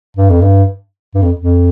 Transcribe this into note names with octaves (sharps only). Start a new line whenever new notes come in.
G2
F2
G2
G2
F2
F2